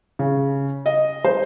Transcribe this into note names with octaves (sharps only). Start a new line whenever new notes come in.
C#3
D#5
C5